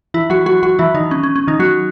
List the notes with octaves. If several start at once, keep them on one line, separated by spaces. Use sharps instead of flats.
E3 E4
F#3 F#4
F#3 F#4
F#3 F#4
E3 E4
D#3 D#4
C#4
C#4
C#4
D#3 D#4
F#3 F#4